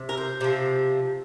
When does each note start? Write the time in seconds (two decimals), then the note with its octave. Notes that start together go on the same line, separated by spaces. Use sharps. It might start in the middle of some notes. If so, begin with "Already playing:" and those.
Already playing: C3
0.09 A#4
0.17 C5
0.41 C3 F3